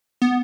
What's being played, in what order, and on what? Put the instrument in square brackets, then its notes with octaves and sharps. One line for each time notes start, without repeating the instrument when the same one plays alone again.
[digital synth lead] B3